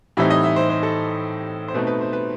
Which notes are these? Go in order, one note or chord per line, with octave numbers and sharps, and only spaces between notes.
A2 E3 G3 C4 D#4 E5
D#5
E5
C5
C5
A4
C5
B2 A3 C4 D#4 B4
B4
C5
B4